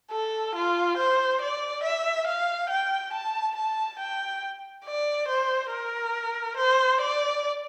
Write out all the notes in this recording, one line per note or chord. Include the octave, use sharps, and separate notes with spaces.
A4
F4
C5
D5
E5
F5
G5
A5
A5
G5
D5
C5
A#4
C5
D5